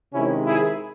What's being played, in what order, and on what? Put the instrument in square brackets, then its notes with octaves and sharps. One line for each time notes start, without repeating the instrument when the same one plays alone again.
[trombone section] C3 D#3 G#3 C#4 E4
E4 G#4